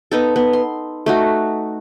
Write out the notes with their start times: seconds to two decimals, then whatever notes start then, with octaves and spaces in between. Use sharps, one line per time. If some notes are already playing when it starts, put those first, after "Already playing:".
0.11 B3 D#4 A4
0.36 B3
0.53 C6
1.06 A3 D#4 F#4